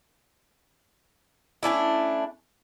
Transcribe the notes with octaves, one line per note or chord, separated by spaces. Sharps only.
A3 C#4 D4 E4